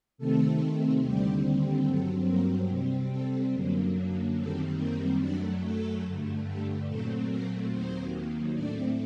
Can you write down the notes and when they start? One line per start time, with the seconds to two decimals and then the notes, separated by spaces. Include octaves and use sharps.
0.18 C3 D#3 A3 C4 A4
1.02 D#2 D3 G3 C4 G4
1.85 G2 F#3 C4 A4
2.27 A#3 A#4
2.69 C3 G3 C4
3.11 A4
3.53 F#2 D3 F#3 A#3
4.36 F#2 D#3 G3 C4 A4
4.78 A#3 A#4
5.19 F#2 F#3 A3 D4 D5
5.62 A4
6.04 G2 D3 A3
6.45 G4
6.87 A#2 F#3 A3 C4 A4
7.29 A#3 A#4
7.71 D#2 D#3 F#3 A#3 C4 C5
8.54 A2 A3 C4 D4 D5